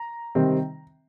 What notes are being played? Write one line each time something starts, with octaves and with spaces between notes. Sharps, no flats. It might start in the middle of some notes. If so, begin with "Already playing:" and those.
Already playing: A#5
C3 D#3 G3 C4